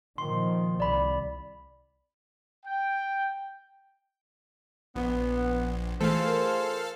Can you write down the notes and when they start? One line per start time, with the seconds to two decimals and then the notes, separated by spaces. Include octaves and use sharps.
0.18 A#2 D#3 F3 C6
0.80 C2 D5 B5
2.65 G5
4.96 A#1 B3
6.01 E3 A3 F4 G#4 A4 C5 F5
6.27 A#4